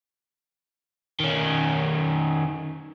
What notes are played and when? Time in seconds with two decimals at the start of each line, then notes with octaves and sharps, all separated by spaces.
1.20 D#3 C#4